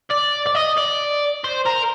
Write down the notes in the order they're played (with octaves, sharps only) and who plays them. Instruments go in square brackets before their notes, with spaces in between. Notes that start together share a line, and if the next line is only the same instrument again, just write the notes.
[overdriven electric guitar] D5
D5
D#5
D5
C5
A#4